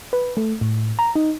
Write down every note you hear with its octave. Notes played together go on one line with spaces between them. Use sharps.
B4
A3
A2
A#5
D#4